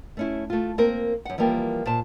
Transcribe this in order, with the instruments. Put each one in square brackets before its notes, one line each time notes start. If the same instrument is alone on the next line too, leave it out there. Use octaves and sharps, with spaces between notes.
[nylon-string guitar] A3 C#4 E4
A3 F4
A#3 C4 A#4
F#2 F#5
E3 F3 G3 A#3 A#4 G5
A#2 C5 A5